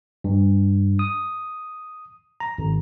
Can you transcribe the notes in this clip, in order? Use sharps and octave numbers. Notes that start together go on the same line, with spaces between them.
G2
D#6
A#5
G#1